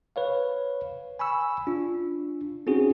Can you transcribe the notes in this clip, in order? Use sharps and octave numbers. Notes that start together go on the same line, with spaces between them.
B4 C#5 F5
G#5 B5 C#6 E6
D4 F4
C4 C#4 D#4 F#4 G#4